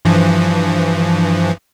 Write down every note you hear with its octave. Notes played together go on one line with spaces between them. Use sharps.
G2 E3 F3